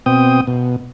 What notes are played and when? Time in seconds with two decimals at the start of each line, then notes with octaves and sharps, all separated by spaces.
0.06 B2 C4 G5 D#6
0.47 B2